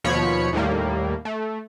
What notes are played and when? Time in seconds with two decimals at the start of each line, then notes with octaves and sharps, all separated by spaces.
0.04 D#2 B2 F3 C#5 B5 C#7
0.53 D#2 A2 G3 A#3
1.25 A3